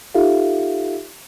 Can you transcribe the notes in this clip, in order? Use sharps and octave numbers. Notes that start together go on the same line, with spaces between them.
D#4 F4 G4 A4 E5 F5